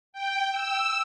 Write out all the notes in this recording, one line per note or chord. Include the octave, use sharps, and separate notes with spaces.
G5
E6